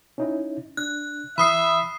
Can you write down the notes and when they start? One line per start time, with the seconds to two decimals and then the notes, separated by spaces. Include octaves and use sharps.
0.18 C#4 D#4 E4
0.77 D4 F#6
1.38 E3 E5 B5 D#6 C7